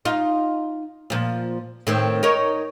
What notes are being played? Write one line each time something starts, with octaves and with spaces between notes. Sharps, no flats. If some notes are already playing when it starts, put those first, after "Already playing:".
D#4 F4
A#2 F3
A2 D#3 C4
D#4 A#4 C#5